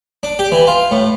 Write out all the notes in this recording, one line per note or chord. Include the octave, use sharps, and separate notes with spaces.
D4
G4
E3
F4
A2